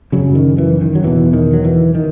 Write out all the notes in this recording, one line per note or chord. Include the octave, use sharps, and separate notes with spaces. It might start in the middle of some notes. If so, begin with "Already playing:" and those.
F#2 C#3 F#3
D#3
E3
D#3
F#3
E2 B2 E3
D#3
F#3
E3
D#3